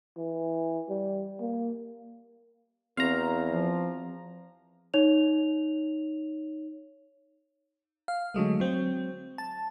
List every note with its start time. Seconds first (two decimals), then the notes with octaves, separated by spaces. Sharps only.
0.17 E3
0.89 G3
1.41 A#3
2.97 E2 C4 F#4 F5 A#5
3.47 F3
4.94 D#4 C#5 F7
8.08 F5
8.34 D3 F#3 G#3 A3
8.60 F#3 C4
9.38 A5